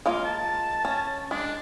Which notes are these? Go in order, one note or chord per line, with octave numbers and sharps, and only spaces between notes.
G#3 A#3 F4
A5
C#4
G#3 D4